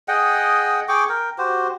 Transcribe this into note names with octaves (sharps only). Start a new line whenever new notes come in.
G#4 D#5 F#5 G5
G#4 G5 C#6 D6
A#4 G5
F#4 G4 C5